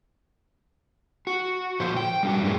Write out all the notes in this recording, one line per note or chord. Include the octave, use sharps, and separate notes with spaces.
F#4
A#2 D3 F3 C5
G5
G3 D4 F#4
F#2 A2 G#3 A#3